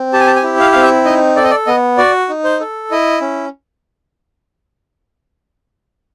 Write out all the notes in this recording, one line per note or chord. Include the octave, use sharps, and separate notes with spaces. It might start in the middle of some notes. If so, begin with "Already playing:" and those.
Already playing: C4
G4 A5
G#5
A5
G#5
E4
F5
C4 F5
E5
D#4 D#5
A4 D5
D#5
D5
B3 D#5
F#4 D5
D#4
C5
A4
E4 D#5
C#4